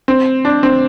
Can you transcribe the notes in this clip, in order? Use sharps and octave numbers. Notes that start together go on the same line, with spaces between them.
C4
D4
C4